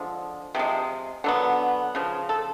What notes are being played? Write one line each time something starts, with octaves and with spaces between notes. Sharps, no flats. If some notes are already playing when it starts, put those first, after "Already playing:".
Already playing: D3 F3 G#3
C3 F3 G#3
D3 F#3 B3
C#3 F3
A4